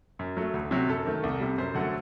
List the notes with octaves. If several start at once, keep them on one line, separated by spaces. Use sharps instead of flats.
F#2
F#3 A3
D2
C3 F#3
F#2 A4
D#3 A3
C2
C3 G3
F#2 C5
D3 F#3 A3 F#5